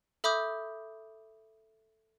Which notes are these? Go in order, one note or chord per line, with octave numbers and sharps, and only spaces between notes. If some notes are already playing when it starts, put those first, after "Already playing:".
A4 E5 B5 D6 D#6 G6